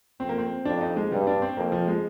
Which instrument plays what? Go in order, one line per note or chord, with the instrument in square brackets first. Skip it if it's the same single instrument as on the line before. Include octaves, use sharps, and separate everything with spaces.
[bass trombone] F2 [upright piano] C4
[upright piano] A#3
C4
[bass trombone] F2 [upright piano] D4
[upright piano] D#4
G#3
[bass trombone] G2 [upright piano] G3
[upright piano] D4
C4
[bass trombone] F2 [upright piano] A#3
[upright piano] F3
G#3